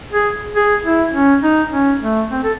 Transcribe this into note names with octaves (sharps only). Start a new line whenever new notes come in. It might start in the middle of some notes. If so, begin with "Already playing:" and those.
G#4
G#4
E4
C#4
D#4
C#4
A3
C4
A4